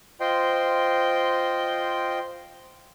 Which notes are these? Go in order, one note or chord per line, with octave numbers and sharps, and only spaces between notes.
F4 C5 D#5 G5 C6